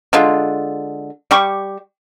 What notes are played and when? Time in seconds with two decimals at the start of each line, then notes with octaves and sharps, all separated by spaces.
0.13 D3 G#3 F4
1.31 G3 G4 C#6